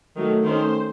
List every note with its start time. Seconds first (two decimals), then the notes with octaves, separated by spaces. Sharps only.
0.15 D#3 F#3 A3
0.43 D#3 A3 C#4 C5